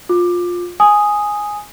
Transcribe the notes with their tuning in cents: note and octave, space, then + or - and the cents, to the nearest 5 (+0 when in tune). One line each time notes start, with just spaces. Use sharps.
F4 +15 D6 +15
G#5 +0 D#6 +0